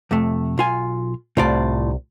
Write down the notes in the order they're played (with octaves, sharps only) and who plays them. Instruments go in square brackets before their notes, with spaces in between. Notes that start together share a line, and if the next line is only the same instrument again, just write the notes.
[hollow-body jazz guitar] F2 C3 A3
B1 F4 G#5
[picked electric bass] C2 C3 [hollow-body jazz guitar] A2 F4 D5